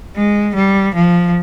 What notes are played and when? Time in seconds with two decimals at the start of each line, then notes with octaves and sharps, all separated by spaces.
0.15 G#3
0.55 G3
0.95 F3